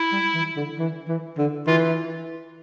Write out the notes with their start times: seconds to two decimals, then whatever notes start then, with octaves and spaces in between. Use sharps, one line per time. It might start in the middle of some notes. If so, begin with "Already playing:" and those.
Already playing: E4
0.12 G3
0.35 E3
0.56 D3
0.79 E3
1.08 E3
1.38 D3
1.67 E3 F4